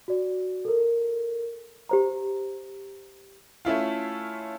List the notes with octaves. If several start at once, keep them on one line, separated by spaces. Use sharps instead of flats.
F#4 D5
A4 A#4
G4 C5 A#5
A3 C#4 E4 F4